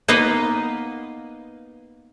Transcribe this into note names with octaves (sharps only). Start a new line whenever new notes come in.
A#3 B3 D#4 B4 D#5 F5